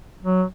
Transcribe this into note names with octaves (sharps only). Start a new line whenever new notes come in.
F#3